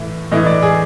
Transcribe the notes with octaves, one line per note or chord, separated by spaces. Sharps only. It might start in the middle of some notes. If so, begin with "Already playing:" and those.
Already playing: A2 E3
A2 E3 D#5
D5
G#4